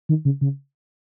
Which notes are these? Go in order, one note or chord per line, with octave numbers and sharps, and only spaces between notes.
D#3
C#3
C#3